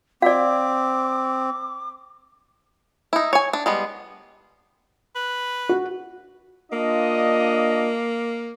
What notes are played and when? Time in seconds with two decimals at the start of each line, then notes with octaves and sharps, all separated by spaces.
0.22 C4 D5 F5 D6
3.13 D#4 E4
3.33 C#5 G#5
3.53 D4
3.66 G3 G#3 B3
5.16 B4
5.69 F#4
6.72 A#3 D4 F4 D#5